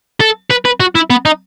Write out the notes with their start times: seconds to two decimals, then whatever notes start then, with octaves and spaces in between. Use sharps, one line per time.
0.20 A4
0.50 B4
0.65 B4
0.80 F#4
0.95 E4
1.10 B3
1.25 D#4